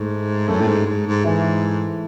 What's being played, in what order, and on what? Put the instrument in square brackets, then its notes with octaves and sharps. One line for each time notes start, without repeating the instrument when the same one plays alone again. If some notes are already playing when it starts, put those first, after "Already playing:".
Already playing: [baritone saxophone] G#2 [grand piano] A3
[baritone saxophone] F#2 [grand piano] A3 A4
[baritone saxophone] A2
G#2
G#2
G#2
[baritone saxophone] G#2 [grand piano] E3 E4